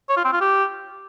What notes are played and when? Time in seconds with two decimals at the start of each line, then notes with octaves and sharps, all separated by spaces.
0.09 C#5
0.17 F4
0.25 C4
0.33 F4
0.41 G4